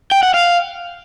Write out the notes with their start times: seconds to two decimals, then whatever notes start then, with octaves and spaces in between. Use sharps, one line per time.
0.12 G5
0.23 F#5
0.34 F5